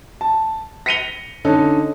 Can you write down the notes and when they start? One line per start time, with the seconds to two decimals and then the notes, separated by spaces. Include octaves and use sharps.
0.21 A5
0.86 A#6 B6 C#7 D#7 F7 G7
1.45 D3 C#4 D#4 A4